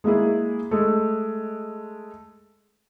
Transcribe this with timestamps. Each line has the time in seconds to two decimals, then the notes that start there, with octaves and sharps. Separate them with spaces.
0.04 G#3 A#3 E4 G#4
0.71 G#3 A3